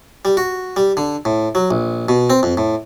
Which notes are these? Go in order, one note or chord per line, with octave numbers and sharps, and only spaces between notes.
G3
F#4
G3
D3
A2
F#3
A#1
B2
C4
F2
A2